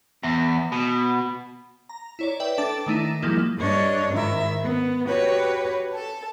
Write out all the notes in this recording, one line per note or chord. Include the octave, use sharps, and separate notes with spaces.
E2
B2
A#5
E4 C#5 D5
B4 D5 E5 G5
D4 A4 A5 D6 A6
D#3 A3 D#4 E4
F3 G3 G#3 A#3 E4
G2 D4 C#5 D#5
G#2 D#3 E4 E5
B3
F#4 G4 B4 C#5
A4 A5